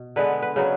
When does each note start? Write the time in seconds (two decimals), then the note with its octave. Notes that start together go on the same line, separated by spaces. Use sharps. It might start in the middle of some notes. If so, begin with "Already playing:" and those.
Already playing: B2
0.16 D3 G#3 B3 B4
0.42 B4
0.56 C#3 F#3 B3